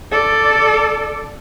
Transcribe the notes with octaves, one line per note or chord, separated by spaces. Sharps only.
A4 D5